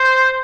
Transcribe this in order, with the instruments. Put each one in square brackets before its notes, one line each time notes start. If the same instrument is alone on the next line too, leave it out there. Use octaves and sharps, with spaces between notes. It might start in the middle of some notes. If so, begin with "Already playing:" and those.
Already playing: [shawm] C5